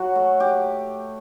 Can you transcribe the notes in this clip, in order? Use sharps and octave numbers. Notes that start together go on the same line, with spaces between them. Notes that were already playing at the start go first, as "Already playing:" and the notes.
Already playing: F#3 F#4
A3
G4